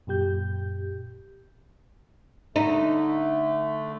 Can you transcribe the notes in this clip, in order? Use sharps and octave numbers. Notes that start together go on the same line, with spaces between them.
F#2 A#2 G4 G6
D3 A3 D#4